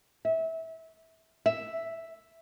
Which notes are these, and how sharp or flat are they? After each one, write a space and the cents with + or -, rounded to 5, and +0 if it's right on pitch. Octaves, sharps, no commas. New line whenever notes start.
E5 -25
E5 +0